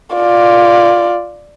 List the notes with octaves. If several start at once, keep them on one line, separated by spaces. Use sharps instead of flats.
F4 D5